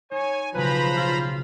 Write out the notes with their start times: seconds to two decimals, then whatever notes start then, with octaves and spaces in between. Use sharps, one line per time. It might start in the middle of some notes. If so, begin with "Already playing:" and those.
0.11 D#4 C#5 G#5
0.54 B1 C#3 F3 B4 C5 A#5 B5
0.97 F4